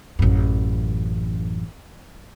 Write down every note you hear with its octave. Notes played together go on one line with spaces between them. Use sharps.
A1 F#2